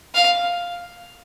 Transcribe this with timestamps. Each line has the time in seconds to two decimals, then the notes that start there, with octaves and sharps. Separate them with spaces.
0.15 F5